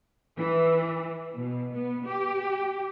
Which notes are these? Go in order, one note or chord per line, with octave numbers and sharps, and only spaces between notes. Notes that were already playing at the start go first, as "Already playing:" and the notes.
E3
B2
B3
G4